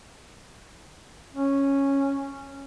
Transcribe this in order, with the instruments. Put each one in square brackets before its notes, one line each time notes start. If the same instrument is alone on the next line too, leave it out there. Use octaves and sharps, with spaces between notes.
[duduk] C#4